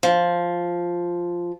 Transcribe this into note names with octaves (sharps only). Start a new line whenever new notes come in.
F3